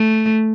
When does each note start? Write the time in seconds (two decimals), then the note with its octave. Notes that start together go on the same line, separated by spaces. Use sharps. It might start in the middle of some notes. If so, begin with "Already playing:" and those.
Already playing: A3